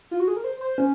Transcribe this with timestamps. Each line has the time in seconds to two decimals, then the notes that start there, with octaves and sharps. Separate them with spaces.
0.11 F4
0.20 F#4
0.28 G#4
0.36 A#4
0.44 C5
0.61 C5
0.78 C#4